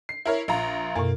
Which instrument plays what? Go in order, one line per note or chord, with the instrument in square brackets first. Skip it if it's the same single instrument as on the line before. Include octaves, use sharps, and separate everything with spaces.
[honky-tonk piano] C7
E4 A#4 C#5
A#1 F4 A#5
[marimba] F#2 B2 [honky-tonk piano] A#3